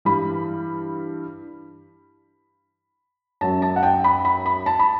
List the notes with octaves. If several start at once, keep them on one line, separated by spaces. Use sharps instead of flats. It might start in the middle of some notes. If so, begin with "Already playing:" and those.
G2 E3 G3 B5
F#2 F#3 A5
A5
F#5
G5
B5
B5
B5
A5
B5